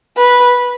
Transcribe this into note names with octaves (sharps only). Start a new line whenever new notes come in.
B4